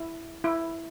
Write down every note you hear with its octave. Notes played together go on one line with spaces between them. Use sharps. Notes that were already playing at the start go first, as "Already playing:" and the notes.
Already playing: E4
E4